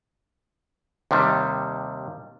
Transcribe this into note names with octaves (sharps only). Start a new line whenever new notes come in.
D#2 C3 D#3 G3